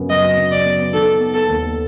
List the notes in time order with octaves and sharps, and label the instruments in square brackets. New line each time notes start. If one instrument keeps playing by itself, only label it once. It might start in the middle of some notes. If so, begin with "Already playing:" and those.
Already playing: [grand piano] F#2 C#3 B3
[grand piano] F#3 [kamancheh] D#5
[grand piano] C#3
[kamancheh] D5
[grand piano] B3
[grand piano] D#3 [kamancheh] A4
[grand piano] B3
[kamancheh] A4
[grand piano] D#2